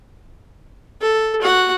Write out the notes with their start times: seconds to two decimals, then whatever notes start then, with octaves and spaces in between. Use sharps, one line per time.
1.01 A4
1.42 F#4 F#5